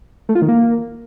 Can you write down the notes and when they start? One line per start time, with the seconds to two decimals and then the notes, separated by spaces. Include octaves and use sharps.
0.29 A3
0.35 F4
0.42 D#3
0.48 A#3